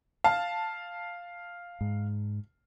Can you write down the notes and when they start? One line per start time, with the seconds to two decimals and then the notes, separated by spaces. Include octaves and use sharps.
0.24 F5 A5
1.81 G#2